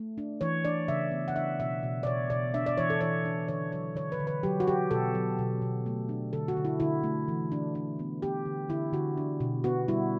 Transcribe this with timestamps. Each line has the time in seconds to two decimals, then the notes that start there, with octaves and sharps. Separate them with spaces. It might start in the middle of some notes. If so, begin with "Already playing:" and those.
Already playing: A3
0.18 D4
0.41 E3 C#5
0.65 D4 D5
0.88 C#3 E5
1.11 B3
1.28 F#5
1.35 D4 E5
1.60 B2 E5
1.83 B2
2.03 D5
2.06 B2 C#5
2.30 B2 D5
2.54 D4 E5
2.66 D5
2.78 E3 C#5
2.90 A4
3.01 E3 C#5
3.25 D4
3.48 D3 C#5
3.72 F#3 C#5
3.95 D3 C#5
4.12 B4
4.20 D3
4.27 B4
4.43 F#3 G4
4.60 F#4
4.67 F#3 G4
4.91 B2 A4
5.15 F#3
5.39 B2
5.62 B2
5.86 A3
6.09 D4
6.33 D3 A4
6.48 F#4
6.57 D3
6.65 E4
6.80 D3 E4
7.04 A3
7.28 E3
7.52 D4
7.75 D4
7.99 B3
8.22 B3 G4
8.45 D3
8.69 D3 E4
8.93 D3 F#4
9.17 D4
9.40 B2
9.64 B3 F#4
9.88 G3 E4